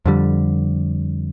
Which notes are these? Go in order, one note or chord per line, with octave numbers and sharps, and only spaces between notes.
F2 D3 G3